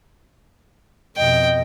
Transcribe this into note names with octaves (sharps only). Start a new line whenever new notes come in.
F2 B2 D#5 G5